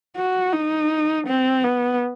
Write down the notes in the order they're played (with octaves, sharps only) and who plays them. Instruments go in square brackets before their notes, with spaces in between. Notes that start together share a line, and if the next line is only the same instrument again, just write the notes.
[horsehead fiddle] F#4
D#4
C4
B3